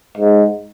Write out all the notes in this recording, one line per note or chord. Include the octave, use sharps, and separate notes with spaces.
G#2